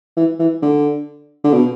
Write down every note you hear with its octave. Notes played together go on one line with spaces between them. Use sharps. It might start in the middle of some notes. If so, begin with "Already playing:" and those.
E3
E3
D3
D3
B2